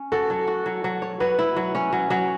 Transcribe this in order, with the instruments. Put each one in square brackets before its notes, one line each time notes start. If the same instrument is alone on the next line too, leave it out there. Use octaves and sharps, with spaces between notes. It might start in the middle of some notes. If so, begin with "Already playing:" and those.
Already playing: [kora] C#4
[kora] F#4 [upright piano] A4
[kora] F#3
F#4
F#3
F#3
C#5
[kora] F#3 [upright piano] B4
[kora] E4
F#3
C#4
F#3
F#3